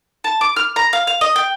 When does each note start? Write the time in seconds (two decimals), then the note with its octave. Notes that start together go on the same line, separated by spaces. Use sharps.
0.24 A5
0.41 D6
0.56 F6
0.76 A#5
0.93 F5
1.07 F5
1.21 D#5
1.36 G5